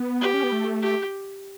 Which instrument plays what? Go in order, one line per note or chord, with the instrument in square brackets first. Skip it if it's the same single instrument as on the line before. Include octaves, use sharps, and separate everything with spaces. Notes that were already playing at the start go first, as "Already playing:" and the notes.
Already playing: [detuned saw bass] B3
[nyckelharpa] G4
[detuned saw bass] C#4
B3
A3
[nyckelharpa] G4